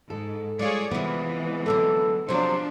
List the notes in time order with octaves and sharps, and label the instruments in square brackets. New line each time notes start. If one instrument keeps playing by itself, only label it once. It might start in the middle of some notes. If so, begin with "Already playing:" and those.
[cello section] G#2 [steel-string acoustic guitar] A4
[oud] G#3 F4 [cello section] G#4 C#5 D5
[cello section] C3 E3 G#3 [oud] F3 E4 [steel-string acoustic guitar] B3
[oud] D3 F#3 A3 [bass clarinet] A4
[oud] C3 F#3 [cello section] F3 D4 [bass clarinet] C5